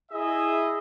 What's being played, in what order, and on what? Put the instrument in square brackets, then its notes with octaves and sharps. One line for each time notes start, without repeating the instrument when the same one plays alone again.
[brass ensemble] E4 G#4 D#5 E5